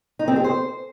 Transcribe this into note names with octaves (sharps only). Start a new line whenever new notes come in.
D#4
C4
G#4
C5